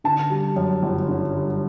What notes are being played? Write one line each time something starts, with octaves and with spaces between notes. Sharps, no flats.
D3 A5
G3
F#2
G1
D3
G3